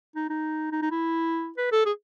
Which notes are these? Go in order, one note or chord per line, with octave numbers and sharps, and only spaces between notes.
D#4
D#4
D#4
D#4
E4
B4
A4
G#4